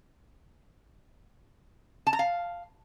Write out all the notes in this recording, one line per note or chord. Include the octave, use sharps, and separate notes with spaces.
A5
A#5
F5